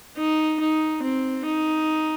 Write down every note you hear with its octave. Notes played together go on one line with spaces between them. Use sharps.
D#4
D#4
C4
D#4